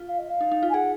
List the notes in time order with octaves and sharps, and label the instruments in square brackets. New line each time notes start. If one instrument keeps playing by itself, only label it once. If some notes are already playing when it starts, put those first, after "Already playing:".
Already playing: [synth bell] F4
[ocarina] F5
D#5
F5
[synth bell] D#4
D#4
F4
[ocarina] G#5
[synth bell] G#4 [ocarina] F#5